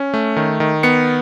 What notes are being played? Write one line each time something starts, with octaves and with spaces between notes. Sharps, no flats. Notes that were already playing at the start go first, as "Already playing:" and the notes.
Already playing: C#4
A3
D#3
D#3
B3 C#7